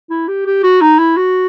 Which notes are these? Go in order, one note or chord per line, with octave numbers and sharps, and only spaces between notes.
E4
G4
G4
F#4
D#4
E4
F#4